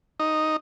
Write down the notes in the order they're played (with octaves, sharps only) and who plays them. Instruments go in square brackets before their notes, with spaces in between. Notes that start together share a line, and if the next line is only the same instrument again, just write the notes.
[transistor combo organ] D#4